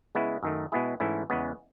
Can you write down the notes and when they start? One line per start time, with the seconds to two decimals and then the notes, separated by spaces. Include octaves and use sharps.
0.15 C#3 G#3 B3 E4
0.43 F#2 D#3 A3
0.72 B2 G#3 B3 E4 G#4
1.00 G#2 E3 A3 C#4 E4
1.30 E2 C#3 G#3 B3